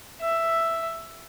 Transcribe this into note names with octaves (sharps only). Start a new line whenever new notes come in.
E5